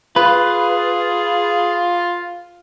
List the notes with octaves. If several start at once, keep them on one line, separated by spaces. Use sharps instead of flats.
F4 G#4 B4